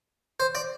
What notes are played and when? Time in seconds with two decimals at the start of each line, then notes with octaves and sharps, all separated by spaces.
0.40 C5
0.55 D5